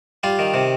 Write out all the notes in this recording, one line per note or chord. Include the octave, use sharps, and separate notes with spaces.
G3 F4
D#3
C3